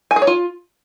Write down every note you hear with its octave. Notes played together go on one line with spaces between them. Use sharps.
G#5
G#4
C#5
F4